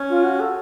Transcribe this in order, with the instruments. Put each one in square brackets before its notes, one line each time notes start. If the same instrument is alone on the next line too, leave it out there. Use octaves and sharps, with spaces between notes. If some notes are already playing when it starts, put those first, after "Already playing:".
Already playing: [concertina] C#4
[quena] F4
F#4
A4